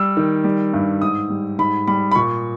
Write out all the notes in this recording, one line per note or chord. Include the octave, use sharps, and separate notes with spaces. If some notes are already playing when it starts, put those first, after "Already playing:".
Already playing: G3 E6
D#3
G3
G2
G#2 D#6
G3
G#2 B5
G3 B5
B5
A#2 C#6